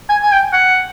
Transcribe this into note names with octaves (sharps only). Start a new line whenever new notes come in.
G#5
G#5
G5
F#5